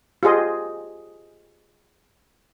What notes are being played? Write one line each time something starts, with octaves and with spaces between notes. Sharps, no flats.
F4 G4 G#4 D#5